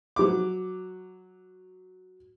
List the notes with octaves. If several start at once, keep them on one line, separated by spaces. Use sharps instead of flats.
F#3 D6